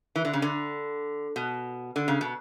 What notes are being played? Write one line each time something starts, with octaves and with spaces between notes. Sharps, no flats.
E3
D3
C#3
D3
B2
D3
C#3
B2